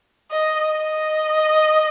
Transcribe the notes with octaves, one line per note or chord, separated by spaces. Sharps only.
D#5
D#5